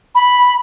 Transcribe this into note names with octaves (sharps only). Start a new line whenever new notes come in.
B5